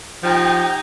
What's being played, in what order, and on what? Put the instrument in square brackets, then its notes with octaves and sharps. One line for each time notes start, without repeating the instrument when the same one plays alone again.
[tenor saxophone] F3 [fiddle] D#4 G4 [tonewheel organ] G5